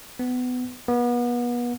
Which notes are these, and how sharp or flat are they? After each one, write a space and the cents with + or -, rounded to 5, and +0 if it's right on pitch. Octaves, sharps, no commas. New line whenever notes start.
B3 +20
B3 -35